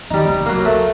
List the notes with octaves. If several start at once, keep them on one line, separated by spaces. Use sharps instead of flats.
D#3 G3 D#4
F1 C#2
F#3 A#3
A3